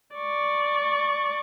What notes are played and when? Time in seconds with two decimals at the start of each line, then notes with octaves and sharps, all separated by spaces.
0.16 D5 C#6